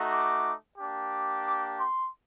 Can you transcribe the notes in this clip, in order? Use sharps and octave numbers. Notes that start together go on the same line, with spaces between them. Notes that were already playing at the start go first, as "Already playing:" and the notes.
Already playing: A3 D#4 F#4
D6
A#3 D4 G4
D6
C6